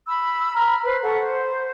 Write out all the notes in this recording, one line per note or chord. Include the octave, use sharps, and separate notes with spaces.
B5 E6
A#5 B5 F6
B4 C5
A4 F#5 C#6
C5